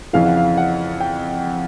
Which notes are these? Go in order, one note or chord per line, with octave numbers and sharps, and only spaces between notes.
F2 C#3 E3 F5
F#5
F5
F#5
G5